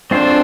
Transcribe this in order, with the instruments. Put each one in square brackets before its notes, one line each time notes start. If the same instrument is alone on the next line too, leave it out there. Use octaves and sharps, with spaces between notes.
[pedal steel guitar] G#3 C4 F4 A4 C5 [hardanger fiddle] D4